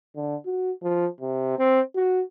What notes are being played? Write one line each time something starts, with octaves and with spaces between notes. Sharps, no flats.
D3
F#4
F3
C3
C4
F#4